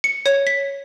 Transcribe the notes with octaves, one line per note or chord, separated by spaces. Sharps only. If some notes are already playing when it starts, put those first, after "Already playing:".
C#7
C#5
B6